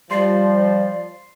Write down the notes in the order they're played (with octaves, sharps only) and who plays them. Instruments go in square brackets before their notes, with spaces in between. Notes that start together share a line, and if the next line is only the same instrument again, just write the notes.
[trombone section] F3 [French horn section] G3 [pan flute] D5 [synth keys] C6 C7